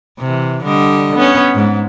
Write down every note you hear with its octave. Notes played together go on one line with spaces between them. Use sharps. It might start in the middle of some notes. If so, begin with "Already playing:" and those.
C3 E3
D3 G3 D#5
B3 C#4
G#2